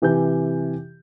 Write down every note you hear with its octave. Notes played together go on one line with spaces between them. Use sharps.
C3 E3 G4 G#5 G6